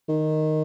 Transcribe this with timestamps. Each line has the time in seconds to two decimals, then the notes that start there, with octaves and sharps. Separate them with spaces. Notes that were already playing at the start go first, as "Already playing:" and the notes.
0.08 D#3